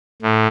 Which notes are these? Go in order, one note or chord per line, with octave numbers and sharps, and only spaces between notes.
A2